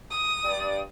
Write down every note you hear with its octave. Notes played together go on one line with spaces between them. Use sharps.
D#6
G2 D5